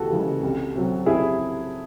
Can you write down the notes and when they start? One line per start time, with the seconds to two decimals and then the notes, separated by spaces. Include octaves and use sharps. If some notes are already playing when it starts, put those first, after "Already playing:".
Already playing: D#2 C#3 E3 G#3 F#4 A4
0.11 C#3 E3 G#3
0.43 C2
0.75 C3 F#3
1.06 C2 E4 G#4